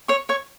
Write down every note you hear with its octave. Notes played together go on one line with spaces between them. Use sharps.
C#5 C#6
C#5 C#6